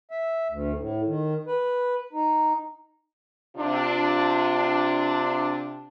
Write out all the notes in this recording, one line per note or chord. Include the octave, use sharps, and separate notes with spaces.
E5
D2
A2
D#3
B4
D#4
C3 D4 F4